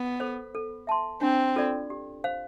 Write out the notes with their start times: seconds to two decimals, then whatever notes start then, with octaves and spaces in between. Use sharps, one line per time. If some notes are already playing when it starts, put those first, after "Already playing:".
Already playing: B3
0.20 A4 C5
0.55 A4
0.87 E5 A5 C6
1.21 C4 D4
1.56 F4 A4 D5
1.90 G4
2.24 C5 F5